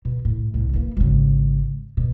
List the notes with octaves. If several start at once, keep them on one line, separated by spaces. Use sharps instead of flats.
B2
A2
C2 A2
E3 A#3
G#1 C#3
B2